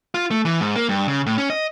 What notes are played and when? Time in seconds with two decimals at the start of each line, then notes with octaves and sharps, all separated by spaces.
0.14 F4
0.31 A3
0.45 E3
0.61 G#2
0.76 A#3
0.89 G2
1.08 C#3
1.26 A2
1.38 C#4
1.50 D#5